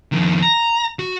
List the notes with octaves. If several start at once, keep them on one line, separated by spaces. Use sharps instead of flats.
F2 D#3
A#5
F#4